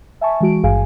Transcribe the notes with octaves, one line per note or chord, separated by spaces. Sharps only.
E5 G#5 A5 C#6
E3 G#3 F#4 D7
G#1 G2 G#4 F5 G#5